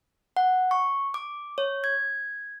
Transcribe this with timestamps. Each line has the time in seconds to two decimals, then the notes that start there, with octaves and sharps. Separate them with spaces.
0.37 F#5
0.71 C#6
1.14 D6
1.58 C#5
1.84 G#6